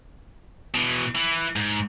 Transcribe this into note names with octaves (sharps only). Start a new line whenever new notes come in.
B2 E3
E3
G#2